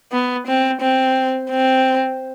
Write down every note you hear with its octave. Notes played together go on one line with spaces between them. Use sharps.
B3
C4
C4
C4